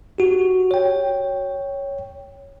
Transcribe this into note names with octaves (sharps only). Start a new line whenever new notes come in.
F#4 G4
C#5 G5